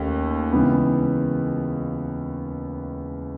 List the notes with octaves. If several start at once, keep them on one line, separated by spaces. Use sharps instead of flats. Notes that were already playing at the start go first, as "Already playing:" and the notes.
Already playing: D#2 A3 C#4
C#2 C#3 E3 B3